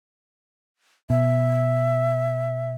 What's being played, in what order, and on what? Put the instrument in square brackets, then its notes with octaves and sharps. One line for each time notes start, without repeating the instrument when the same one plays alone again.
[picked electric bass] B2 [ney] E5